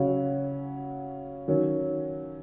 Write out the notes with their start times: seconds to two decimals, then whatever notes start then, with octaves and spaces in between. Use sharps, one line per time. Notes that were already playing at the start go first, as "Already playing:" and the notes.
Already playing: C#3 F#3 C#4 F#4
1.48 D#3 F#3 C#4